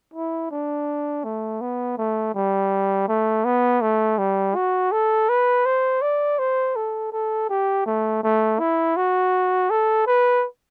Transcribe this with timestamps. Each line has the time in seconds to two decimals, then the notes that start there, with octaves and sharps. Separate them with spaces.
0.14 E4
0.51 D4
1.24 A3
1.61 B3
1.98 A3
2.34 G3
3.08 A3
3.45 B3
3.81 A3
4.18 G3
4.55 F#4
4.92 A4
5.29 B4
5.66 C5
6.02 D5
6.39 C5
6.76 A4
7.13 A4
7.49 G4
7.86 A3
8.23 A3
8.59 E4
8.97 F#4
9.70 A4
10.07 B4